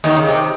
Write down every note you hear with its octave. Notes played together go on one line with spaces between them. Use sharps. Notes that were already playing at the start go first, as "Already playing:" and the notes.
D#2 D#3
C#3
C3